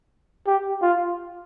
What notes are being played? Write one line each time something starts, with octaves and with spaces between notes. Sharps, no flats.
G4
F4